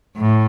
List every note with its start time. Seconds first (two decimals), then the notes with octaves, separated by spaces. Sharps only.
0.17 A2